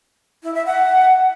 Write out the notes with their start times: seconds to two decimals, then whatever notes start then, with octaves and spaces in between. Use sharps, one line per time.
0.43 E4
0.54 E5
0.66 F#5